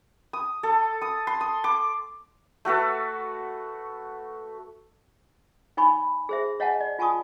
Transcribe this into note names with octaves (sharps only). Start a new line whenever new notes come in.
D#6
A4
D#6
C6
D#6
D6
A3 F#4 A4 B4
D#4 C#5 G#5 B5 C#6
G#4 C5 E5
C#5 D#5 F5 F#5 G#5 A5
D5
F4 G#5 A5 C#6 D#6